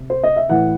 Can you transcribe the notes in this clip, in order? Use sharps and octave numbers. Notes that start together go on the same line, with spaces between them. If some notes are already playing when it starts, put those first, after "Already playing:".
Already playing: C3
C5
D#5
E5
A2 E3 F#5